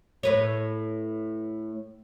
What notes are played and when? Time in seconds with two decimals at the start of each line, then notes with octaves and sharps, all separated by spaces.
0.23 A2 B4 C#5